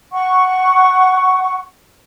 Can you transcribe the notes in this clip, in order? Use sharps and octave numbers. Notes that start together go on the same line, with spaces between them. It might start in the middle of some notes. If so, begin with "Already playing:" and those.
F#5 C#6